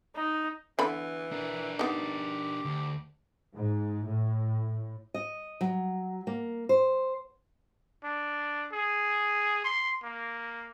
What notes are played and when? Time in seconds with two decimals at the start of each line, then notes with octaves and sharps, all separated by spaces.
0.16 D#4
0.79 D3 E3 B3 B5
1.32 D4 A#4
1.79 B3 D#4 G4
2.65 D2
3.55 G#2
4.06 A2
5.14 D#5
5.61 F#3
6.27 A#3
6.69 C5
8.04 D4
8.73 G#4
9.64 C6
10.03 A#3